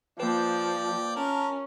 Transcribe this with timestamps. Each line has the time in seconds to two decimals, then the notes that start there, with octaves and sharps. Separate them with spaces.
0.20 F3 A#3 B4 D5 G5
1.15 C#4 A#4 A5